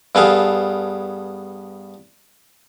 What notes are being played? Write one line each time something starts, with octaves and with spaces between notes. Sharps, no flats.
G2 B3 G#4 A4 F5